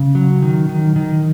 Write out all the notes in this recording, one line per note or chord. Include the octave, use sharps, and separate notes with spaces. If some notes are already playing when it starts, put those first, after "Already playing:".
Already playing: C#3
F#3
D#3
D#3
D#3